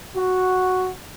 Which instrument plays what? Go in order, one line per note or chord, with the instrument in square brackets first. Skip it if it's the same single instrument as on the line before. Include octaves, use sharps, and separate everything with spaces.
[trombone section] F#4